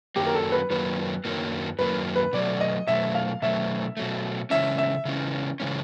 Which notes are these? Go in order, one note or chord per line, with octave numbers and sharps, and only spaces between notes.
F#2 D#3 F#3 A#3 G4
A#4
A4
B4
F#2 D#3 F#3 A#3 B4
F#2 D#3 F#3 A#3
F#2 D#3 F#3 A#3 B4
B4
B2 F#3 A3 D5
D#5
B2 F#3 A3 E5
F5
B2 F#3 A3 E5
B2 F#3 A3
C#3 E3 G#3 C#4 E5
E5
C#3 E3 G#3 C#4
C#3 E3 G#3 C#4